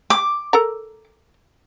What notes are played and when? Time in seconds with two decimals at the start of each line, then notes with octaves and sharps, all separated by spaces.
0.10 D6
0.53 A4 A#4 A#5